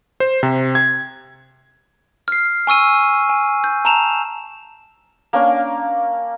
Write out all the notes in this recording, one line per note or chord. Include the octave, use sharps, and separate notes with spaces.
C5
C3
G#6
F6 C7
G#5 C#6 E6 D#7
G#5
G6
A5 A#5 E7 F7
A#3 C#4 D4